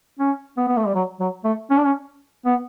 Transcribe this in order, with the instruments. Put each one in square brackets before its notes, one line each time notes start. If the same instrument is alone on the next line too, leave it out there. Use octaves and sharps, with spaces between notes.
[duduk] C#4
B3
B3
A3
G3
F#3
F#3
A3
C#4
D4
C#4
B3